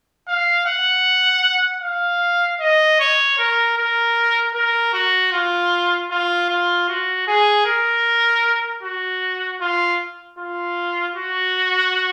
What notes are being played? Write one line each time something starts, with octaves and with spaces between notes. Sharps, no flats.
F5
F#5
F5
D#5
C#5
A#4
A#4
A#4
F#4
F4
F4
F4
F#4
G#4
A#4
F#4
F4
F4
F#4